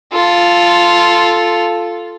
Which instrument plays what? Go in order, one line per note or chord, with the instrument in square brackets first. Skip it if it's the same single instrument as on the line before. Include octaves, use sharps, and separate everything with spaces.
[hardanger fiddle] F4 A4